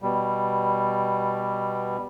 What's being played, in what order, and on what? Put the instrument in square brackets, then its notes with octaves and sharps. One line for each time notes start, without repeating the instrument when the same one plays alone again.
[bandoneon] B2 G3